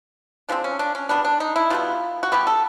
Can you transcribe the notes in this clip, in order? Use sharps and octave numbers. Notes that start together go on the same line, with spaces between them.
F3 G#3 C4 D4
C#4
D4
C#4
B2 G3 B3 D4
D4
D#4
E4
B2 G3 B3 F4
F#4
B2 G3 B3 G4
A4